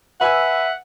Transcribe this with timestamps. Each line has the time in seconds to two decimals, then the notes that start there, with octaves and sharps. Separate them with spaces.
0.21 B4 E5 F#5 G#5 E6